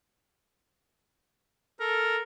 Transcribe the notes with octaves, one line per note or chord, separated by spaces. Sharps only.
A4 A#4